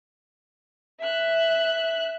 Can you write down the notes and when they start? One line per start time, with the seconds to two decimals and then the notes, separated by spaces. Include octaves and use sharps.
1.00 E5 F#6